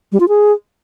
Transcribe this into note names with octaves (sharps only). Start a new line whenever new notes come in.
G3
F4
G#4